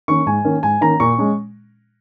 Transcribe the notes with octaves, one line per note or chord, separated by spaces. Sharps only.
D#3 A#3 C#4 C#6
G#2 G#5
D#3 A#3 C#4
G#2 G#5
D#3 A#3 C#4 A#5
A#2 C#6
G#3 C#4